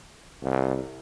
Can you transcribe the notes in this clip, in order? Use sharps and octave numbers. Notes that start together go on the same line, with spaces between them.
C2